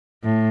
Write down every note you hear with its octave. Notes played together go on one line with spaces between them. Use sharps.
A2